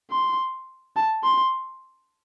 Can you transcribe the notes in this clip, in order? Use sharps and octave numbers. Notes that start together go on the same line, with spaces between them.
C6
A5
C6